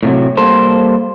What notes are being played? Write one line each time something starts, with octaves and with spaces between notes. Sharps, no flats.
A2 C3 F#3
G3 A#3 A4 C5